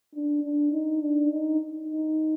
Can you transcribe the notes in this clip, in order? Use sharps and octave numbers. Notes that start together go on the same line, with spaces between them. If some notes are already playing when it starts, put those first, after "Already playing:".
D4
D4
D#4
D4
D#4
D#4